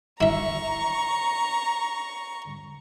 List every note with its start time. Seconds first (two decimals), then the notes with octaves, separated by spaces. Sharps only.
0.21 E4 E5 A#5 C#6